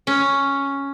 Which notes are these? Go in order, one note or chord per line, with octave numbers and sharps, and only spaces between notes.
C#4